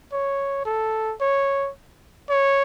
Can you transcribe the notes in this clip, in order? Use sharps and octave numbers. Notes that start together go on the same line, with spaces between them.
C#5
A4
C#5
C#5